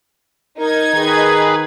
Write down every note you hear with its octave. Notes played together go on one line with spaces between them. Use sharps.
D#4 A#4 G#6
D#3 G#4 B4